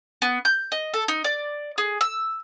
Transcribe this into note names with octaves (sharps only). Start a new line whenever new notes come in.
B3
G6
D#5
A4
D#4
D5
G#4
E6